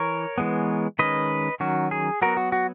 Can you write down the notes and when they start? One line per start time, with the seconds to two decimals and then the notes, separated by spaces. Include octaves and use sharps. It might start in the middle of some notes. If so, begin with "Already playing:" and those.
Already playing: E3 A#4 C#5
0.38 E3 G#3 B3
0.99 D#3 G#3 C#4 B4 D#5
1.60 D#3 F#3 C#4 F#4
1.91 G#4
2.22 F#3 B3 F#4 A#4
2.37 F#4
2.52 F#4